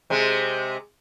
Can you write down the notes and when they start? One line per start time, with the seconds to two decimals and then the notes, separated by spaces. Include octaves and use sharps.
0.10 C3 G#3